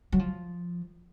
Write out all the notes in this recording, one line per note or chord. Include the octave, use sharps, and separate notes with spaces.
F#3
F3